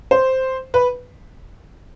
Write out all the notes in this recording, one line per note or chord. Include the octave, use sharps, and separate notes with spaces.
C5
B4